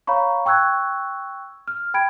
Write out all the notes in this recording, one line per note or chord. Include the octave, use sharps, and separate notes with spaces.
C#5 F5 A#5 B5 C#6
G5 C#6 E6 F#6 G#6
F6
G5 B5 G#6 D7